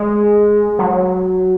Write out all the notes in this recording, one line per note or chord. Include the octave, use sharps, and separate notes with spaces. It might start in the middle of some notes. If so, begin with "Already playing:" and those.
Already playing: G#3
F#3